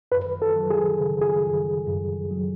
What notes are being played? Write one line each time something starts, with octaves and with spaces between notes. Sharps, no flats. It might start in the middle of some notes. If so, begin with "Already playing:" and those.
F#2 B4
A4
F#3
G#4
C#3
G#4
F#2
F#2
F#3